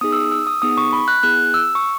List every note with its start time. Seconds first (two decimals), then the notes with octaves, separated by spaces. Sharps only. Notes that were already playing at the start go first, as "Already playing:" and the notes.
0.01 B3 D#4 G#4 D#6
0.13 E6
0.17 D#6
0.32 E6
0.47 D#6
0.62 B3 D#4 G#4 D#6
0.77 C#6
0.93 B5
1.08 F#6
1.23 B3 E4 G#4 F#6
1.54 E6
1.75 C#6